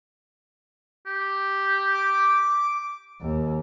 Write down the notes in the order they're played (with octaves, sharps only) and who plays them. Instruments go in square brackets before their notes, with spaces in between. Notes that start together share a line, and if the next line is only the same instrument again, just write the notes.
[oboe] G4
[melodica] D6
[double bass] D#2